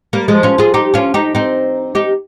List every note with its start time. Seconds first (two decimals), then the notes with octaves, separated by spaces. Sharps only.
0.13 G3 A#3
0.28 F3 G#3
0.43 C#4 F4
0.58 F4 G#4
0.74 D#4 G4
0.94 C#4 F4
1.14 D#4 G4
1.35 C4 D#4
1.95 D#4 G4